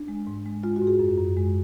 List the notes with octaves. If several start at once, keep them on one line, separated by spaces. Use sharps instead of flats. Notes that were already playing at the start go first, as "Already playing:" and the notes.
Already playing: D4
G#3
G#2
G#3
G#3 F4
F#4
G#2
G#4
F#2
F#2
G#3